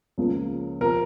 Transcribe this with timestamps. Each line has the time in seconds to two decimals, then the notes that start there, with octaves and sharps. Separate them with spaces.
0.18 C#2 C#3 F3 A#3
0.81 C3 F3 A#4